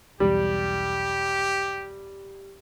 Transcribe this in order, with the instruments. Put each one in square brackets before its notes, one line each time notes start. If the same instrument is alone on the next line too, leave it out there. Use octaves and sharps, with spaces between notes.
[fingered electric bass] B1 E2 [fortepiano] G3 [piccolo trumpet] G4